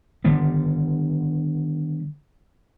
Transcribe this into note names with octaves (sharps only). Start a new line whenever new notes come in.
D3 D#3 G3 B3